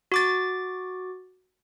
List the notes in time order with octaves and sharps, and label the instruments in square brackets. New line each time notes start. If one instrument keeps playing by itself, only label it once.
[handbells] F#4 D6 A6